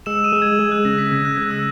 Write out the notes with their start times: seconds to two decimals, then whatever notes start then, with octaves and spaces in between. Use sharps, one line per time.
0.06 G#3 E6 E7
0.24 D#6 D#7
0.32 G#3
0.42 G#6
0.59 G#3 D#6
0.72 F#6
0.85 C#3 A#6
0.98 B6
1.12 C#3 G#6
1.25 F#6
1.37 G#3 F#6
1.51 E6